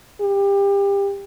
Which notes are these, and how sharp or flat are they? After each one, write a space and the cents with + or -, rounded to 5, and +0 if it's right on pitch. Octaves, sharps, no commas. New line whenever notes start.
G4 +25